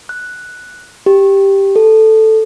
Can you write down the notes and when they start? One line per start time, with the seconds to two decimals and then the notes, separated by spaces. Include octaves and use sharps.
0.09 F#6
1.06 G4
1.76 A4